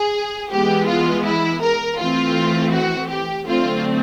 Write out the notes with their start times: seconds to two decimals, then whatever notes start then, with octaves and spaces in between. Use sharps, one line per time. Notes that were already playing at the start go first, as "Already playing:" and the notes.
Already playing: G#4
0.51 E3 G#3 B3 G4
0.89 F4
1.25 E4
1.62 A#4
1.99 E3 A3 C4 F4
2.72 F#4
3.10 G4
3.46 D3 F#3 A3 C4 F4